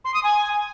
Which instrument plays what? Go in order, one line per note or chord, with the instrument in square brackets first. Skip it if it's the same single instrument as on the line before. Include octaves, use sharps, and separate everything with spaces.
[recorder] C6
D#6
G#5